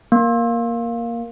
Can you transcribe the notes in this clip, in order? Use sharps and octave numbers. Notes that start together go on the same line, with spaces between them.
A#3